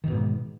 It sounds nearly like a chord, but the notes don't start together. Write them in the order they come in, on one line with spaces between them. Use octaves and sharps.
D#3 B2 G#2